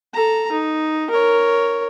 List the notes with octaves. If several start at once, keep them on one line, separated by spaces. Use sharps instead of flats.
A4 A#5
D#4
A#4 C#5